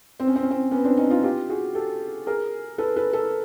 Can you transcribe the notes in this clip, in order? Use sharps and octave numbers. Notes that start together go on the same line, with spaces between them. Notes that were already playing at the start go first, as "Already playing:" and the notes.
C4
C#4
C4
C#4
C4
B3 C#4
C4 D4
C#4 D#4
D#4 F4
F4 G4
F#4 G#4
G4 A4
G#4 A#4
A4 B4
A4 B4
A4 B4